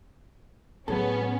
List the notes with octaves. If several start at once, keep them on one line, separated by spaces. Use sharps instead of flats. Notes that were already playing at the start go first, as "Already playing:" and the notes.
A2 F#3 B3 C#4 G#4 A4